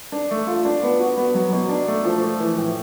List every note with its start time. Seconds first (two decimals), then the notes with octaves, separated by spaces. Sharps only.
0.12 D4
0.31 A3
0.47 F4
0.65 D4
0.83 B3
1.00 F#4
1.17 B3
1.34 F#3
1.53 B2
1.69 D4
1.88 A3
2.04 F3
2.22 A3
2.40 E3
2.57 A2